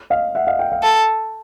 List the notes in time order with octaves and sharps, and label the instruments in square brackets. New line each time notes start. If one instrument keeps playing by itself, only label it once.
[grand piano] D#5 F5
E5 F#5
D#5 F5
F5 G5
F5 G5
[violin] A4